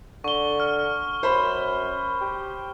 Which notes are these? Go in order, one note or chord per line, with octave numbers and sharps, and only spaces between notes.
D3 C#6 G7
F6
F#2 C5 B5
G4